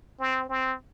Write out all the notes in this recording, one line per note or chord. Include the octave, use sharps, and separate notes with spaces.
C4
C4